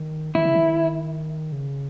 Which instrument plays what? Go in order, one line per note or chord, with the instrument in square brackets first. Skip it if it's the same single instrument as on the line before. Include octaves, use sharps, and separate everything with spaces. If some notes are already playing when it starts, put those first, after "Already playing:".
Already playing: [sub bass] D#3
[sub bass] D#3 [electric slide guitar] E4
[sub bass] C#3
D#3
C#3